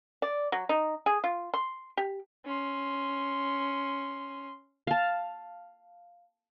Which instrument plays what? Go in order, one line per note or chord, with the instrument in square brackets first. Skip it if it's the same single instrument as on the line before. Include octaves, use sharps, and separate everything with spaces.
[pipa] D5
F#3
D#4
G#4
F4
C6
G4
[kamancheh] C#4 C6
[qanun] F5 A5